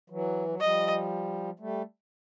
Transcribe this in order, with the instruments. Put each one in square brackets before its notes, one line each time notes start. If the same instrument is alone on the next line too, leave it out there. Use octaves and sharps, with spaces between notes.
[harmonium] E3 F#3
F#3
[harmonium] F3 G3 [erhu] D#5
[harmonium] G3 A3